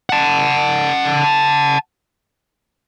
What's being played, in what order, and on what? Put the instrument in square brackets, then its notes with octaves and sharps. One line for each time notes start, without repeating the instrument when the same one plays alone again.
[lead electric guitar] F#5 A5